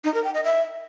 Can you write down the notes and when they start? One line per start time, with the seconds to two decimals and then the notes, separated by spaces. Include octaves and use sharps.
0.04 D#4
0.14 A#4
0.24 G5
0.34 D#5
0.44 E5